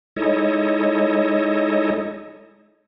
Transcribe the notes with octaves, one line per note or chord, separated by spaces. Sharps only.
G#3 D#4 E4 A4 C#5 D#5